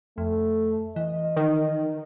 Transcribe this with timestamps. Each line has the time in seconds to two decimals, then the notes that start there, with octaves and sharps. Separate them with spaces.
0.18 F2 A3
0.96 E3 D#5
1.36 D#3